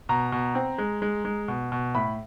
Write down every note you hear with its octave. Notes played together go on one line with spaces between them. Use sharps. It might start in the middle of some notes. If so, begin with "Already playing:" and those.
B2 A#5
B2
C4
G#3
G#3
G#3
B2
B2
A2 B5